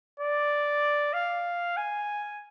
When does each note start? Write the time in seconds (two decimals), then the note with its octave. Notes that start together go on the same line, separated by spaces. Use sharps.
0.19 D5
1.13 F5
1.77 G#5